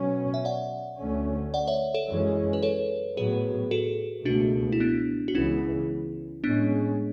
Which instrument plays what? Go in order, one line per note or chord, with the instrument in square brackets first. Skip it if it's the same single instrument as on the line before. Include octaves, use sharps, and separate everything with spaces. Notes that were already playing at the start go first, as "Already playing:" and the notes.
Already playing: [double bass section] B2 F#3 C#4
[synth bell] E5
D5 F#5
[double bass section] D2 D3 A3 C#4
[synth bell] D5 F#5
C#5 E5
A4 C#5
[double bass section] F#2 E3 G#3 C#4
[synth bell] B4
A4 C#5
[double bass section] A2 F#3 B3 [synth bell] G#4 B4
[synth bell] F#4 A4
[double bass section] C#2 B2 A3 [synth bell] D4 F#4
[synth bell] E4
B3 D4
F#4
[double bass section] C#2 C#3 E3 B3 [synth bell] C#4 E4
[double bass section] A2 G#3 C#4 [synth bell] B3 D4